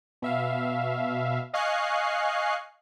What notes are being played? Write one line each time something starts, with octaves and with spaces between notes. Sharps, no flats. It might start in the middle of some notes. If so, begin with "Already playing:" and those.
B2 E5 F5
D#5 F5 G#5 C#6 F#6 C7